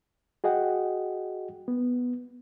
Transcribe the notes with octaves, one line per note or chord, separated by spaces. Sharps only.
F#4 G#4 D#5 F#5 G5
B3